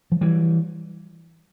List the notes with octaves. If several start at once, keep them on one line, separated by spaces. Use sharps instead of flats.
F3
E3 G3